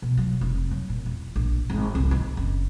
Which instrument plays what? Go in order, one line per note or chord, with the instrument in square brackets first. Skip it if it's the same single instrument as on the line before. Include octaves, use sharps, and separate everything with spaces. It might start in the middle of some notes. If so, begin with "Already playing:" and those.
[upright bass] B2
F#3
F1
F#3
A#2
E2
A#1
G#1
C2
D#3
F#1